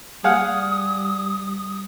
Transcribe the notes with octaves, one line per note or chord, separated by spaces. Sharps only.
G3 G#4 F5 F#5 D#6